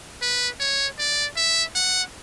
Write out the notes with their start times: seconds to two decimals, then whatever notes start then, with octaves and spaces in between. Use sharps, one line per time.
0.22 B4
0.60 C#5
0.99 D5
1.37 E5
1.75 F#5